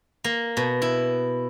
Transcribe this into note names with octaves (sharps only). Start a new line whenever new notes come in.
A#3
B2
E4